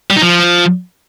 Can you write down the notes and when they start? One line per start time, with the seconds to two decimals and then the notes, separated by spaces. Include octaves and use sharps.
0.10 G3
0.16 D#4
0.22 F3